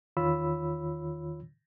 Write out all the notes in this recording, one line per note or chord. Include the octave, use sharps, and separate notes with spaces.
E2 D#3 F4 C#5 B5 E6